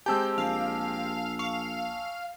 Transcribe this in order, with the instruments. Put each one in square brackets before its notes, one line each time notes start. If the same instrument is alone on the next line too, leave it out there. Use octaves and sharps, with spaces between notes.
[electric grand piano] G#3 C4 G4 [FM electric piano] G#5 A5 E6 [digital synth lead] G6
[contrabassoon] A#1 [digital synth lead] F5
[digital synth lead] F5 [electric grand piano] C#6